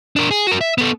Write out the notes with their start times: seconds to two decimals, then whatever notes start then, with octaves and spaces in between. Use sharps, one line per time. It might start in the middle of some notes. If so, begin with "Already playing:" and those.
0.16 D4 A#4
0.31 G#4
0.47 F#4 A#4
0.61 E5
0.78 B3 A4